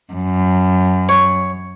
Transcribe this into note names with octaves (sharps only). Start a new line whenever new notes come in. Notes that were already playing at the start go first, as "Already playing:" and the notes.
F#2
C#5